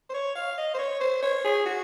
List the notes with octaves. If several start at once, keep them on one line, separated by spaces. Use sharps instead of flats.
C5
C#5
F5
D#5
C5
C#5
C5
C#5
G#4
F#4